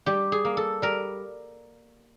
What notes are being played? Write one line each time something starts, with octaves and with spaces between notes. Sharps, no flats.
G3 G4
G#4
A#3
A4
G3 A#4